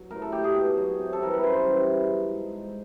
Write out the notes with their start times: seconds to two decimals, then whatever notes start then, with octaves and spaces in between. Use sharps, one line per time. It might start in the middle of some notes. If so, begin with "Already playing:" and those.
Already playing: F#3
0.11 A2 A#4
0.22 A4
0.32 F#3 G4
0.44 G#4
0.55 B2
0.77 F#3
0.99 C3
1.13 A4
1.21 E3 G3 A#4
1.33 B4
1.43 F#2 C5
1.65 C#3 E3 G3
1.87 B2
2.08 F#3
2.31 G#2
2.52 F3